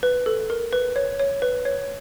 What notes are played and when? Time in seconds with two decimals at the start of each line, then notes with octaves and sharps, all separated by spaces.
0.03 B4
0.26 A4
0.50 A#4
0.73 B4
0.96 C#5
1.20 C#5
1.42 B4
1.65 C#5